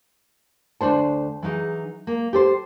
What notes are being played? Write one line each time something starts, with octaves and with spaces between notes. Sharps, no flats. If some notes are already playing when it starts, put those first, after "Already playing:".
D2 G#2 D4 C5 A5
E3 F#3 D#4 G#4
A#3
G4 A4 C5